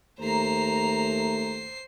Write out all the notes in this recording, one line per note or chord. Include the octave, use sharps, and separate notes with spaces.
D#2 A3 C5 A#5 C7